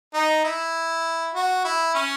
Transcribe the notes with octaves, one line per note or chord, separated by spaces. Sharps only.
D#4
E4
F#4
E4
C#4